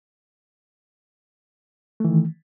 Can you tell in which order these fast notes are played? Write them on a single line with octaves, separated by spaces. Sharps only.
A3 E3 D#3